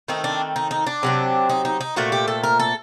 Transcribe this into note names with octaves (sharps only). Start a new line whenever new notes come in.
D#3 A3 C4 D#4
D4
D#4
D#4
D4
C3 F#3 C4
D#4
D#4
D#4
A#2 A3 C4 F#4
G4
A4
A#4
A4